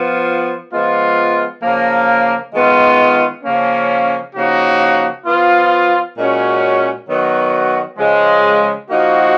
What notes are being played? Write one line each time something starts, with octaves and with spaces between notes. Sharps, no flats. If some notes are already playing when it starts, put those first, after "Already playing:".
Already playing: F3 B3 F4
F3 G#3 B3 F4
C#3 F3 A#3
D#3 G#3 B3 F4
C#3 F3 A#3 C#4
C#3 F3 A#3 D#4 F#4
F3 B3 F4
A#2 G#3 C#4 F#4
D#3 F#3 B3 F#4
C#3 F3 G#3
F3 A#3 D#4 F#4